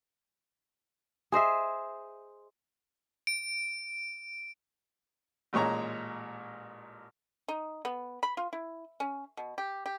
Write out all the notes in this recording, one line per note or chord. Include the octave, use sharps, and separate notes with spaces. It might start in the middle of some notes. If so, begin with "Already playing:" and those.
G#4 C5 D#5 E5
D7
A1 A#2 G#3 C#5 A#5
D#4
B3
B5
F4
E4
C#4
B2
G4
G4